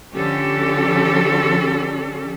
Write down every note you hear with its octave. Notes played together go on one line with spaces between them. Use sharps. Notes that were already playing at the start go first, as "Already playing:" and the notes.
D3 F3 C#4 G4 A4